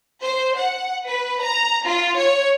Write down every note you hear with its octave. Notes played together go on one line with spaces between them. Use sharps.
C5
F#5
B4
A#5
F4
C#5